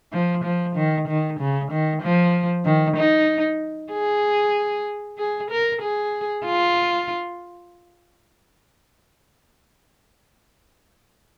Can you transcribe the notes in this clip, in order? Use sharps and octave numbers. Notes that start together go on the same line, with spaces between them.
F3
F3
D#3
D#3
C#3
D#3
F3
D#3
D#4
G#4
G#4
A#4
G#4
F4